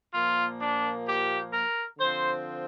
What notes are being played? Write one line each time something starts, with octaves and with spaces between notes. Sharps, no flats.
A#2 F3 A#3 F4
D4
G4
A#4
D3 F3 C4 C5